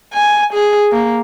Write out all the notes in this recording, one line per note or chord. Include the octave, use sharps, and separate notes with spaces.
G#5
G#4
A#3